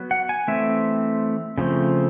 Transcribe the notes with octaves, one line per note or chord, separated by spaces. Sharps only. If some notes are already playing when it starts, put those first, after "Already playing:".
Already playing: F#3 B3
F#5
G#5
E3 A3 C4 E5
C#3 F3 A3 C4